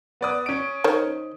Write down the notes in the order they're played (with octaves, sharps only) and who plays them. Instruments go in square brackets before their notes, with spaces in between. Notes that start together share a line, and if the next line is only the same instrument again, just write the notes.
[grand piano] B3 D5 D#6
C#4 D7
[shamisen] D#3 C5 C#5